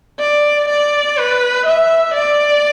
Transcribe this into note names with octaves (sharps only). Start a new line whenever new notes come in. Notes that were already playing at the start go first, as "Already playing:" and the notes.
D5
D5
B4
E5
D5